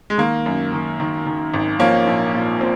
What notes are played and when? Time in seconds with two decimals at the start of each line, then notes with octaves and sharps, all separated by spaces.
0.10 G#3
0.18 D#3 A#3
0.46 F#2
0.72 D#3
1.00 D#3
1.26 D#3
1.54 G#1
1.79 F3 A#3 C#4
2.07 A#1
2.34 A#2
2.61 A#2 C4